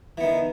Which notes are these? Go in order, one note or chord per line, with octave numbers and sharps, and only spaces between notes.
D#3 E3 B3